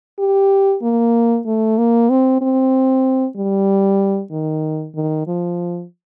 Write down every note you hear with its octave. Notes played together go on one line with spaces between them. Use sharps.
G4
A#3
A3
A#3
C4
C4
G3
D#3
D#3
F3